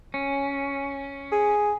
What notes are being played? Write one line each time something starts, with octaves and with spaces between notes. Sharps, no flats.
C#4
G#4